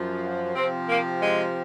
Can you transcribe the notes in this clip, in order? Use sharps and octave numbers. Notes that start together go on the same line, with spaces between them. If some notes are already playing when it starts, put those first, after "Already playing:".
Already playing: F#2 F3
C3 F3 C4
A#3
G#3